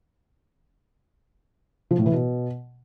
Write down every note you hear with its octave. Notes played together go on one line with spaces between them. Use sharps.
F3
A2
E3
B2